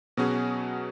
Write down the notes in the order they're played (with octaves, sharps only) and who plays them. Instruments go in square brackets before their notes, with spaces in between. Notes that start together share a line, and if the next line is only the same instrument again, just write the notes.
[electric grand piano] B2 F#3 B3 C#4 F#4 G#4